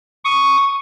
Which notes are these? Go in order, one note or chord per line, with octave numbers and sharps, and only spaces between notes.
C#6 D#6